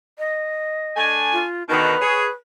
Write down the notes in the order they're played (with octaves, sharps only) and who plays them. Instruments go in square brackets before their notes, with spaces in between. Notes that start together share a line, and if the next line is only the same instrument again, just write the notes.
[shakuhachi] D#5
[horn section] A3 D4 G#5
[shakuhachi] F4
[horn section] B2 D3 D#3 [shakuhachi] B4
[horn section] G#4 C#5